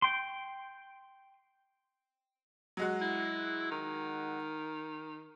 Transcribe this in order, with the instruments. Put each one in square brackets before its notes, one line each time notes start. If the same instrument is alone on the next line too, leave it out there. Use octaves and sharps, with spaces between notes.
[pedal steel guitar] G5 C6
[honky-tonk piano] F#3 G#3 F#4
[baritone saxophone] E4
D#3